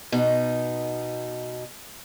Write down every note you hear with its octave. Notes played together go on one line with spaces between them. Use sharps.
B2 D#4